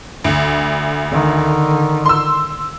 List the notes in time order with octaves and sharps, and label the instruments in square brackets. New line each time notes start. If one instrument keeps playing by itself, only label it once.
[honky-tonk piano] D2 [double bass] D3
[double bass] D3 D#3
[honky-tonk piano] C6 E6